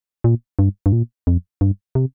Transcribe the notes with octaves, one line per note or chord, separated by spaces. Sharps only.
A#2
G2
G2
A#2
F2
G2
C3